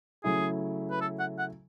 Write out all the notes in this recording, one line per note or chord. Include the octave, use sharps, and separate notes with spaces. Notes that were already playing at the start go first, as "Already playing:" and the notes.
C#3 F#3 A3 E4 G#4
B4
A4
F#5
F#5